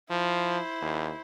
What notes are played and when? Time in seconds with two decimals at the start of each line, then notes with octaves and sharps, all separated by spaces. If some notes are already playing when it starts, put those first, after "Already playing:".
0.10 F3 E4 C5
0.81 D#2